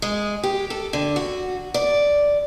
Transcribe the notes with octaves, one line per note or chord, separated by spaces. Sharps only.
G#3
G4
A4
D3
F#4
D5